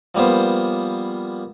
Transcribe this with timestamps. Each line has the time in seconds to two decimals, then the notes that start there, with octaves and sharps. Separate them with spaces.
0.15 F3 G3 A#3 B3 C5